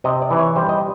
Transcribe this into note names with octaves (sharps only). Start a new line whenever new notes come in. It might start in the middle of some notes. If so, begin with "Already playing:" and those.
C3 D#5
D5
E3
C#5
G3 C5
D#5